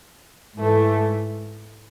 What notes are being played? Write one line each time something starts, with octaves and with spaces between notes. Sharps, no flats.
G#2 E3 A3